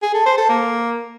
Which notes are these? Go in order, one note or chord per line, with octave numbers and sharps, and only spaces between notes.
G#4
A4
C5
A4
A#3